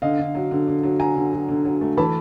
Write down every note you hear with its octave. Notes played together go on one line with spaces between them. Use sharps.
D3 D#5 F5
D3
F#3
D3
D3
F#3
F#3 G#5 A#5
D3
F#3
D3
F#3
A3
E3 A5 B5